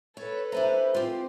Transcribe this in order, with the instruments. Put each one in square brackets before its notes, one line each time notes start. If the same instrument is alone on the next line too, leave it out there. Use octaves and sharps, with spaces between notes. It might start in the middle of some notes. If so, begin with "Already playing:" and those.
[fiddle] A4 B4 [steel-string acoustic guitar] C#5
[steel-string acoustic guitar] D4 G#5 A#5 [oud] E4 E5 [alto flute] C5
[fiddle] C4 [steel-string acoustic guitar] F4 G4